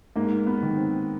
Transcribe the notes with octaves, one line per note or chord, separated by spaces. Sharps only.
G#2 A#3
B3
D#3
C4